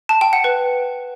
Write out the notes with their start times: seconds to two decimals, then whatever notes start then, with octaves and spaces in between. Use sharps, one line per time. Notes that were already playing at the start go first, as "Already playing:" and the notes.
0.09 A5
0.21 G5
0.33 F#5
0.44 B4